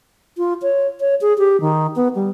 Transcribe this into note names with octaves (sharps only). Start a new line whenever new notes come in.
F4
C#5
C#5
G#4
G4
D#3
B3
G3